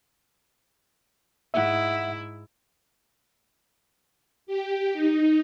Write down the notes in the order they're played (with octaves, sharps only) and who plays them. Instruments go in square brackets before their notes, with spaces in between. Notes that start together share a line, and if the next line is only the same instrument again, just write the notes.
[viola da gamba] G#2 E4 [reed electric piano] E5 F#5
[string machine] G4
D#4